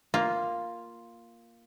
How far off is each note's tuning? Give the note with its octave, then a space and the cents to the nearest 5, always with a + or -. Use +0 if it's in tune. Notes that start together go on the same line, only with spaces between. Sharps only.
A#3 +0 F4 +0